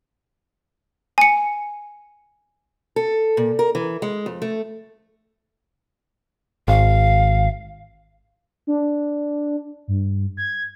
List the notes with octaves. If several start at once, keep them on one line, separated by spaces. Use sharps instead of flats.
G#5 C#7
A4
A#2
A#4
E3
G#3
F2
A3
G#1 F5
D4
G2
G#6